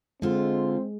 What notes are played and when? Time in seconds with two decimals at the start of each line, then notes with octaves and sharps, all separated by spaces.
0.22 D3 G#3 C4 F4